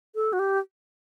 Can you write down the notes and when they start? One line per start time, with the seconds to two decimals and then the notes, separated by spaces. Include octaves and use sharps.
0.15 A4
0.33 F#4
0.39 G4